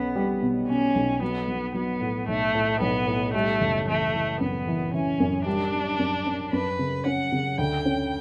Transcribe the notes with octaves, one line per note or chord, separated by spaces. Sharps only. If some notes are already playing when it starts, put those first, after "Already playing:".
Already playing: B1 B3 C#4
G3
B2
B2 C#4
B1
F#3 B3
F#3
F#3 B3
A2
B1 A3
A2
B1 B3
A2
G3 A3
F#1
E3 A3
E3
F#2 B3
E3
E3 C#4
F#2
G3 D4
G3
F#2
C#4
F#2 B4
C#3
C#4 F#5
C#3
D2 G5
C#4